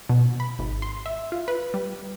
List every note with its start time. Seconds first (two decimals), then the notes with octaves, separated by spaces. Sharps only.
0.09 B2
0.40 B5
0.59 G#1
0.82 C6
1.06 E5
1.32 F4
1.48 B4
1.74 G3